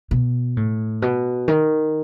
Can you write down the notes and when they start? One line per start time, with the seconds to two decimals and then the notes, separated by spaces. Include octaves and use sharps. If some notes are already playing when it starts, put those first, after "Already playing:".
0.11 B2
0.57 A2
1.02 B2
1.48 D#3